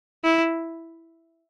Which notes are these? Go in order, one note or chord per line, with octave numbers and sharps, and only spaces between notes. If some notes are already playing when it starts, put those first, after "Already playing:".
E4